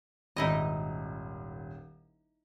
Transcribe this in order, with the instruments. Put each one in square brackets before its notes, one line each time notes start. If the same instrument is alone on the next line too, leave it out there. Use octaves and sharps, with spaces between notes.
[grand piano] D#1 G#1 [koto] D#4 E4 D#5